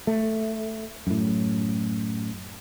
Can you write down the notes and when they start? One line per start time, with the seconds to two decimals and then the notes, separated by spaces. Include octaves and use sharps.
0.07 A3
1.07 F#2 A2